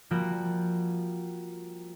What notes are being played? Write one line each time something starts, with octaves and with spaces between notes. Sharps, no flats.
F3 G3 A#3 F#4 G4